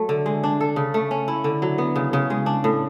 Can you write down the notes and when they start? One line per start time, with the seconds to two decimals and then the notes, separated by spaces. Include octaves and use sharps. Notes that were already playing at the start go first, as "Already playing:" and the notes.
Already playing: F#3 A3
0.09 D3
0.26 G#3
0.44 D4
0.61 A4
0.76 C#3
0.94 A3
1.11 C#4
1.28 E4
1.44 D3
1.62 F#3
1.78 B3
1.96 C#3
2.13 C#3
2.30 G#3
2.46 D4
2.64 A2